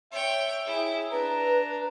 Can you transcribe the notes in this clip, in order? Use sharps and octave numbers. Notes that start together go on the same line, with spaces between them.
C#5 E5 G5
E4 G#4
D4 B4 A#5